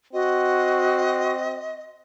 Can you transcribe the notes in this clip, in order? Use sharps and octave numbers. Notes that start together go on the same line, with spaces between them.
C4 F#4 D#5